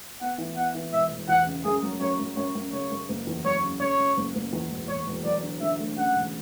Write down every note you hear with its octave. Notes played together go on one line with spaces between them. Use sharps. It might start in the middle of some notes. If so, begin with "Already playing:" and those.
B3 F#5
E3
B3 F#5
E3
E1 E5
E1
E2 F#5
C#3
F#2 G#4
F#3
F#2 C#5
F#2
F#2 C#5
F#2
C#3 C#5
F#2
F#1
E2
F#3 C#5
C#3
C#3 C#5
C#3
F#1
F#1
E2
E1
E1 C#5
E1
F#3 D5
D3
D3 E5
A3
C#3 F#5
E1